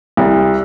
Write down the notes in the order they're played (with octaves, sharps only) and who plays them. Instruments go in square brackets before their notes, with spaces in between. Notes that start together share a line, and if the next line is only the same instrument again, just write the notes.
[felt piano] C2